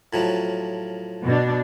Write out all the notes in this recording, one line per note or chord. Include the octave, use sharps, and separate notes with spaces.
A2 F3 F#3
B2 D4